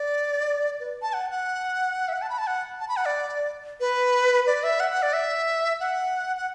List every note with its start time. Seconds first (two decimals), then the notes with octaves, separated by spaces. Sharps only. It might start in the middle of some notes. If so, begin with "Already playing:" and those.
Already playing: D5
0.80 B4
1.02 A5
1.13 F#5
1.31 F#5
2.08 E5
2.13 F#5
2.22 A5
2.30 B5
2.38 A5
2.47 F#5
2.80 A5
2.89 B5
2.96 F#5
3.06 D5
3.80 B4
4.47 D5
4.64 E5
4.80 F#5
4.91 F#5
5.02 D5
5.13 E5
5.80 F#5
6.37 F#5